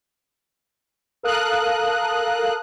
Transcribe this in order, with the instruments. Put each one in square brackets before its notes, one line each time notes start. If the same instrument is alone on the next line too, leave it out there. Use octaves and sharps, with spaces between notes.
[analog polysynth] A4 A#4 F5 D#6 F#6